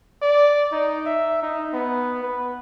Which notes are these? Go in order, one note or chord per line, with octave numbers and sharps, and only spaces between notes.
D5
D#4
E5
D#4
B3
B4